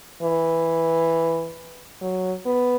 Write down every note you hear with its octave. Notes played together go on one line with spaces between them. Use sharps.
E3
F#3
B3